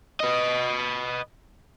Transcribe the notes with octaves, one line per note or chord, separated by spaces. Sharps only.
B4 D#5